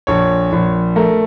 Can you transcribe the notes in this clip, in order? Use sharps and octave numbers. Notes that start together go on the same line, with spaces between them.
A#1 C#5
A#1
A3 A#4